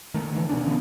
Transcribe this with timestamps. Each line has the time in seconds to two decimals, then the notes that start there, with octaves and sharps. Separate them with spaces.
0.14 D#3 A3
0.32 D3 E3
0.49 B2 D#3 C#4 D4
0.63 D3 E3 F3 B3